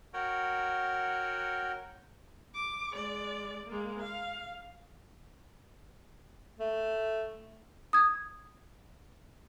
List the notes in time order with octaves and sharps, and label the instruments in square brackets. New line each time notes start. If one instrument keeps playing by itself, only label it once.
[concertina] F#4 A#4 C#5 F#5 G5
[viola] D6
G#3 D5
G#3 A#3
F5
[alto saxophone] A3
[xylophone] D#6 G#6